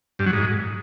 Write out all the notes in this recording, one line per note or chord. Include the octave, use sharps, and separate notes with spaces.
G2
F#3
G#2